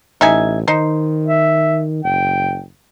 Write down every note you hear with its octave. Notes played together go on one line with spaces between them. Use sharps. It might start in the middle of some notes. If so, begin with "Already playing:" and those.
A1 D#4 E5 G#5
D#3 D#4 C5
E5
F#1 G5